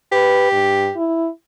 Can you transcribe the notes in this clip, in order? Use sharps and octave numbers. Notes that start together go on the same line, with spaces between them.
G4 B4
G2
E4